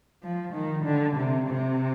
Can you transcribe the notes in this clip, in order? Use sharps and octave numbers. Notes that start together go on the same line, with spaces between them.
F3
D#3
D3
C3
C3